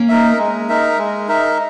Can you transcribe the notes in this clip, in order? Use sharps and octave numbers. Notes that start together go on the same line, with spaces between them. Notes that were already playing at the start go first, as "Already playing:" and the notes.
Already playing: A#3 C#4
D#4 A#4 E5
G#3
D#4 A#4 E5
G#3
D#4 A#4 E5